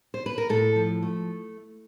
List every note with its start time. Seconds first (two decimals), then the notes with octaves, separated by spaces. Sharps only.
0.14 C5
0.26 B4
0.38 A#4
0.49 A2 A4
0.76 F3
1.03 A3